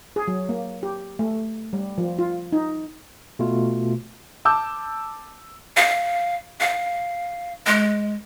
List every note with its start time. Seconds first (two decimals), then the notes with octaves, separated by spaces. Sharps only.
0.16 G#4
0.28 F#3
0.49 A#3
0.83 G4
1.19 A3
1.73 G3
1.98 F3
2.19 F4
2.52 D#4
3.39 B2 A3 F4
4.45 A5 D6 E6 G6
5.77 F5
6.60 F5
7.66 G#3